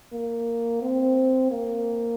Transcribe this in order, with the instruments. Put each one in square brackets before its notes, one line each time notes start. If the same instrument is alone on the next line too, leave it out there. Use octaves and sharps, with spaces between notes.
[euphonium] A#3
C4
A#3